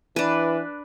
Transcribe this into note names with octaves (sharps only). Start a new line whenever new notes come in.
E3 D4 B4